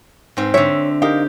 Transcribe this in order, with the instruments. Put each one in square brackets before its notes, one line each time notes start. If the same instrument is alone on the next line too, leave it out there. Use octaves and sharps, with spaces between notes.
[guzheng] G#2 C4
[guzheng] D3 E5 [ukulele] C#5
[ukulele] D#4 A#4 F5 [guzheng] G4